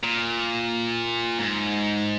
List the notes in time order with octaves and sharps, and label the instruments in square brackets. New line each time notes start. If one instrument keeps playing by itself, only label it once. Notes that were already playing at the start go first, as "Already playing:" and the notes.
[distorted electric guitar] A#2
G#2